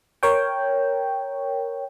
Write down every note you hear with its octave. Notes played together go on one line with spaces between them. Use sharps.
A#4 C#5 G5